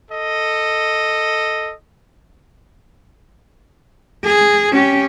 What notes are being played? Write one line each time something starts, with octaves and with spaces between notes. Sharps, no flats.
A4 D#5
G#4
C#4 G4